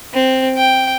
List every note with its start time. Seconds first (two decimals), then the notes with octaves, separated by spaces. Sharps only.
0.13 C4
0.57 G5